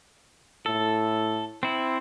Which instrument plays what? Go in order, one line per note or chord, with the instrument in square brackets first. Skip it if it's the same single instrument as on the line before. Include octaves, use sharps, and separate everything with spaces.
[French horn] A2 [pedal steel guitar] A4
[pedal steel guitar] C4 E4